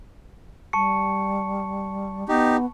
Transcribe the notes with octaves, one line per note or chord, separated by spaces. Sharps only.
G3 A5 C#6 C#7
B3 D#4 G4